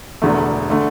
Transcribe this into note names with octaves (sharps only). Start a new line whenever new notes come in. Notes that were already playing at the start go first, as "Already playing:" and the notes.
E1 E2 D3 A3
D3 A3